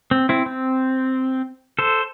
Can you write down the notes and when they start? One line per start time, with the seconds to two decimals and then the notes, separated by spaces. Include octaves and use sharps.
0.11 C4
0.29 C4 E4
0.46 C4
1.79 A4 C5